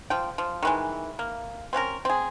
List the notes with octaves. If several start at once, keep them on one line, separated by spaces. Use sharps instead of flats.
F3 G5
F3
D#3 E3 G#3
A#3
C4 C#4 F#4 A#4
C4 G#4